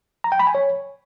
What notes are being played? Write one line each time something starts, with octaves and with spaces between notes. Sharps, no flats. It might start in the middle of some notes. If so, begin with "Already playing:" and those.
A#5
G5
B5
G#5
C#5